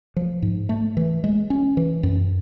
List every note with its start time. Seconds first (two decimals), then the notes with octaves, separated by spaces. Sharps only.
0.16 F3
0.42 G#2
0.69 A3
0.97 E3
1.24 G#3
1.50 C#4
1.77 E3
2.03 F#2